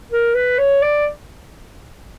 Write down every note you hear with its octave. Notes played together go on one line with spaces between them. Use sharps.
A#4
B4
C#5
D5